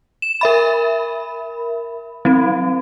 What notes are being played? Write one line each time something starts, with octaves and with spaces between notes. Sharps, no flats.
E7
A#4 E5 B5
F#3 C4